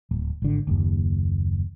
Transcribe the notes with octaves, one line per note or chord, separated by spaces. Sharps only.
D1
G#1 D3
F#1 D#2